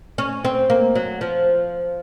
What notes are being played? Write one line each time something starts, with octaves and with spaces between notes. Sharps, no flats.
C#4
C4
A#3
F#3
F3